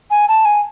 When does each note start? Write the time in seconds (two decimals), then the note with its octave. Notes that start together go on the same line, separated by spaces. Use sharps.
0.11 G#5
0.29 A5
0.45 G#5